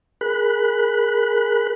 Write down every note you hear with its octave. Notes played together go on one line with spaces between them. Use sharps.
G#4 A#4 B5 F#6